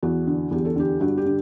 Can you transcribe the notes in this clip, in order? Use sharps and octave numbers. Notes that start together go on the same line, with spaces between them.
E2 F#4
D3
E2 G4
A4
D3 G4
G2 F#4
G4
D3